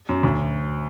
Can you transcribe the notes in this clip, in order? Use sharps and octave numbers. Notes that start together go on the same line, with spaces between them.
F#2
D2